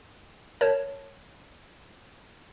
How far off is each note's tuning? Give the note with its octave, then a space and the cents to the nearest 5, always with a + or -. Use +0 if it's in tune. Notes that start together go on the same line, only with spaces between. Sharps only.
A#4 -15 C#5 +0 A5 +0